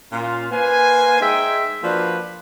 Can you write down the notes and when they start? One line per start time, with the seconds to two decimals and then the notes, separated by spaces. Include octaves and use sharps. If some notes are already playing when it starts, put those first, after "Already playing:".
0.12 A#2 C#4 F4
0.51 A#3 B4 C5 G#5
1.20 G#3 D#4 E5 G5
1.82 F3 A#3 D4 F#4 B4